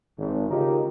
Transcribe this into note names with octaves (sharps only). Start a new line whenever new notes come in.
G#1
C#3 D#4 F4 G4 A#4